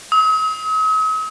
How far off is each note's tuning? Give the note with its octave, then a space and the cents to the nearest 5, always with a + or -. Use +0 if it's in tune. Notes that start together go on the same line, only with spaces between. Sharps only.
D#6 +45